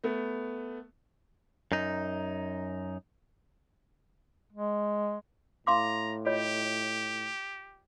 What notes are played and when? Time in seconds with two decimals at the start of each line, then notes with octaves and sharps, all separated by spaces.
0.04 A3 B3
1.72 F#2 D#4
4.53 G#3
5.67 A2 F5 A#5 C6 D6
6.26 F4 G4 C#5 D#5